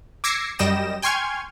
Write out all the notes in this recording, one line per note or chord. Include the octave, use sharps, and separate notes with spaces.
D6 E6 G#6 A#6 C7 C#7
F#2 G3 D#5 G5 A#6 E7
G5 G#5 C6 C#6 F6 G#6